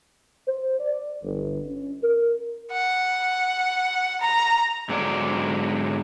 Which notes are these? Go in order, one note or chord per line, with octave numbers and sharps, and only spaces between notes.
C5
D5
G1
C#4
A#4
F#5
A#5
G#2 D3 F#3 A3 A#4 D5